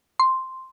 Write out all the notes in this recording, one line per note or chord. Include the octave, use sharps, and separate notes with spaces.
C6